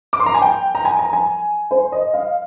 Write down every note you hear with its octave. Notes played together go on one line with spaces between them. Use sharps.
D6
C6
A#5
G#5
G5
A#5
G#5
A#5
G#5
C5
D#5
F5